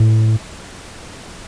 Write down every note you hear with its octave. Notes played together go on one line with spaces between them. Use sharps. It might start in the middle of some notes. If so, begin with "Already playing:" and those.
Already playing: A2